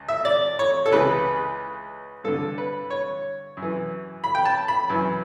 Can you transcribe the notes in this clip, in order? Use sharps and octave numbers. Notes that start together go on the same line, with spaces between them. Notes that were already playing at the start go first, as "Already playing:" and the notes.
Already playing: C#2
E5
D5
C#5
A4
C#2 C#3 E3 B4
G2 D3 A4
B4
C#5
F#2
E3
B5
G5
A5
B5
F#2 E3